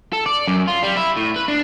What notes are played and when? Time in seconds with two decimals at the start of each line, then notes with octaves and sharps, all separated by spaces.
0.13 A4
0.26 D5
0.47 F#2
0.67 F4
0.83 G3
0.97 E4
1.17 A2
1.36 B4
1.48 D4